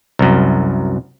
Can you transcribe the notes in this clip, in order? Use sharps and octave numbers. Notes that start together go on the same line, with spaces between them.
C2 F#2